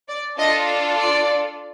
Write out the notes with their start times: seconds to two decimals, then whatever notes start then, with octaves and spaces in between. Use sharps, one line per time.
0.09 D5
0.38 D4 F4 A4 D#5
1.00 D5